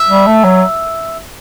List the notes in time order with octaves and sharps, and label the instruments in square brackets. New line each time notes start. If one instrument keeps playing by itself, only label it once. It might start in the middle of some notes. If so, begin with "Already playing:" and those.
Already playing: [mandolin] E5
[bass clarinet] G3
A3
F#3